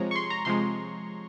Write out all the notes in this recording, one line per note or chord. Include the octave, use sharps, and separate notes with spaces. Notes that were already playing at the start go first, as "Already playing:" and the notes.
Already playing: C3 F3 G#3 C#5 A#5
C#6
C6
A#5
C3 F3 G#3 C6